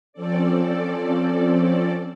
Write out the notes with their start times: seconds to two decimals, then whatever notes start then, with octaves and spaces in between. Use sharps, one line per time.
0.13 F3 C4 C#4 A4 D5